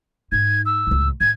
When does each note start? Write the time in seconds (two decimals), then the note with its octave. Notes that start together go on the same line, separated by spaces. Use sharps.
0.32 G#2 D#4 G#6
0.65 E6
0.87 C#2 A2
1.21 A2 G#6